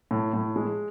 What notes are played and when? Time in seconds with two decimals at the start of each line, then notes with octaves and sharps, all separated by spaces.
0.11 A2
0.33 A2
0.56 G#3